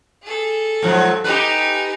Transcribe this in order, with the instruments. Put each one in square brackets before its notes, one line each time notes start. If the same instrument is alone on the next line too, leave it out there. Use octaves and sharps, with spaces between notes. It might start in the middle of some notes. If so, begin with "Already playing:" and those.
[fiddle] G#4 A4
[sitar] G#2 F3 F#3
[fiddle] D#4 G#5 [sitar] G4 B4